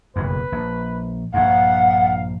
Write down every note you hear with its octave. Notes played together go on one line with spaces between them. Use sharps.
F#1 B1 F2 B4
A#1
A#1 G2 F5 F#5